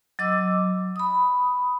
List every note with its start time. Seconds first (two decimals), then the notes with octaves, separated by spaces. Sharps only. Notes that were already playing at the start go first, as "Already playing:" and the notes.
0.19 F#3 D#5 D6 E6
0.96 B5 D#6